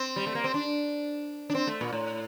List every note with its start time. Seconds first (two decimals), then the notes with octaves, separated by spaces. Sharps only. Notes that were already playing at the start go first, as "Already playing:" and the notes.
Already playing: C4
0.16 G3
0.27 A3
0.35 A#3
0.44 C4
0.54 D4
1.50 D4
1.55 C4
1.67 A3
1.81 A#2
1.93 A2